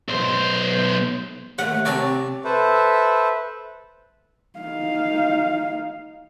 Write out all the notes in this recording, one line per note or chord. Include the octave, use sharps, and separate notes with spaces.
B1 C5
D#2 A3 F#5
C3 C4 C#5 D5 A5
A4 B4 C5 E5
D#4 F5